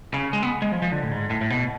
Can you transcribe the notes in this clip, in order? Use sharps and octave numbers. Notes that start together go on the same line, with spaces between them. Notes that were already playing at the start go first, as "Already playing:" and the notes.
C#3
G#3
B3
G#3
F3
F3
D3
A2
G#2
A2
A2
B2